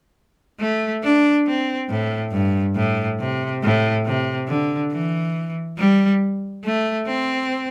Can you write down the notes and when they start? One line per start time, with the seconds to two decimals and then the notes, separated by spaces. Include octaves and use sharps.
0.60 A3
1.03 D4
1.47 C4
1.89 A2
2.32 G2
2.76 A2
3.20 C3
3.63 A2
4.06 C3
4.48 D3
4.92 E3
5.78 G3
6.65 A3
7.07 C4